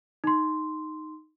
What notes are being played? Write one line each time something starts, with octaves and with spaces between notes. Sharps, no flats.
D#4 C6